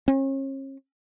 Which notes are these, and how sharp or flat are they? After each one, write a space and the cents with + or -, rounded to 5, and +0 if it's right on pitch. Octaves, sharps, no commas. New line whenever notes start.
C#4 -40